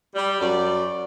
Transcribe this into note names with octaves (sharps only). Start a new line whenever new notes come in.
G3
F#2 D5